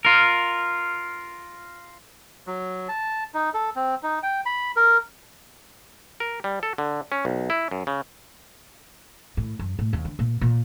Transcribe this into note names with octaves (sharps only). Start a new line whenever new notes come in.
F4 A#4
F#3
A5
D#4
A4
C4
D#4
G5
B5
A#4
A#4
G3
A4
D3
C#4
B1
E4
F#2
C#3
A2
F#2
A2
D#2
D3
A#2
A#2